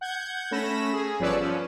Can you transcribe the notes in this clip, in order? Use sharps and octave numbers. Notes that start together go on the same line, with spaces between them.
F#5 G6 G#6
A3 C#4 B5 A#6 E7
G#4
G1 F3 C#4 B4 D5 E6
F3 C#4